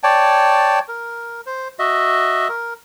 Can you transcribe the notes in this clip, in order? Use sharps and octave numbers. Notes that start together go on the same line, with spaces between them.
C#5 D5 G5 A5
A#4
C5
F#4 D#5 E5
A#4